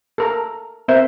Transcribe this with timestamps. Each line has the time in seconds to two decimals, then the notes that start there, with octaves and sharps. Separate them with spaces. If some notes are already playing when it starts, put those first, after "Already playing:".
0.18 A4 A#4 A#5
0.88 C4 A#4 C5 E5